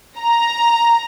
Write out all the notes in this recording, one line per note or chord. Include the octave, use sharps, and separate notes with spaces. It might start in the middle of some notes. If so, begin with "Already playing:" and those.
A#5